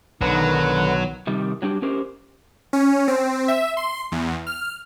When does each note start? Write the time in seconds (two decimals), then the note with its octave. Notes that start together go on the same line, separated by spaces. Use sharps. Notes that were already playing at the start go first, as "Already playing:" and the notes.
0.21 B1 D3 D#3 F#3 B4
1.27 C3 D#3 G3
1.62 F#3 G3 D4 G4
1.82 C#4 G4 A#4 C5
2.73 C#4
3.08 C4
3.48 E5
3.77 C6
4.12 E2
4.47 F6